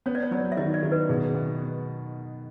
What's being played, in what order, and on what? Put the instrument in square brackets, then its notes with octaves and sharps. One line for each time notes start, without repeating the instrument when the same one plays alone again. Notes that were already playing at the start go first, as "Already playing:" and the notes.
[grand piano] B3 [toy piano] C#5
[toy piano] D5
C#5
[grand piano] F#3 [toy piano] D5
[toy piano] E5
[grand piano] D#3 [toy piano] D#5
[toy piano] D5
[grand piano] D#3
[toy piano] B4
[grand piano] B2 [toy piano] G#4
[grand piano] B3